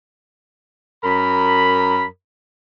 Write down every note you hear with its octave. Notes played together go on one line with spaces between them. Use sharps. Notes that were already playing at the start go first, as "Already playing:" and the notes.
F#2 A#4 B5